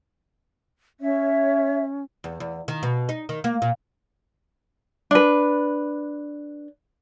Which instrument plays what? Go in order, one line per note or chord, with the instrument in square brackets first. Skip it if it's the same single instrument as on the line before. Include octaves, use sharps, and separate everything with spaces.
[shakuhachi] C#4 [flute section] C#5 E5
[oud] E2
E2
D#3
B2
D#4
D#3
A#3
A#2
[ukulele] D4 B4